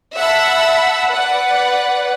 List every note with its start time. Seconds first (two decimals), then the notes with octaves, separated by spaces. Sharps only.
0.16 E5 F#5 A5 B5 E6
1.12 B4 D5 F#5